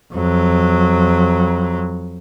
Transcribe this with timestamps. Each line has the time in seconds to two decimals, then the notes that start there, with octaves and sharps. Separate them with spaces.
0.14 F2 F#3